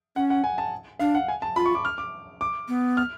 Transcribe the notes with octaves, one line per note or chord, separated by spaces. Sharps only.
C#4 F#5
F#5
G#5
A5
D4 F5
F#5
G#5
A5
F4 B5
C#6
D6
F6
D6
D6
B3
F6